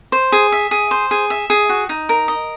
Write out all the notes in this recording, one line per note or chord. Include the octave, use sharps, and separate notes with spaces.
C5
G#4
E5
G#4
C5
G#4
E5
G#4
F#4
D#4
A#4
D#5